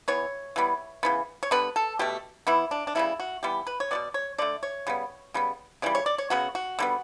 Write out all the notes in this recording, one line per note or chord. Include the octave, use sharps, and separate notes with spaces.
E3 B3 C#5
E3 G3 B3
C#3 E3 B3
C#5
D3 G3 B3 B4
A4
B2 A3 G4
E3 B3 E4
D4
D4
C#3 G3 B3 E4
F#4
E3 G3 B3 G4
B4
C#5
B2 G3 B3 D5
C#5
D3 A3 D5
C#5
C#3 G3 B3
C#3 G3 B3
C#3 E3 G3 D5
C#5
D5
C#5
C#3 F#3 B3 F#4
F#4
D3 G3 B3